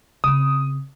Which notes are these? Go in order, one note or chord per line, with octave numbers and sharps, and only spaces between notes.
C#3 C4 D#6